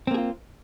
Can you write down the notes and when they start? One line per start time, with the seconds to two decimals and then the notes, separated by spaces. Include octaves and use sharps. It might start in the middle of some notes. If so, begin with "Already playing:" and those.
0.07 C4
0.11 A#3
0.14 G#4
0.18 F4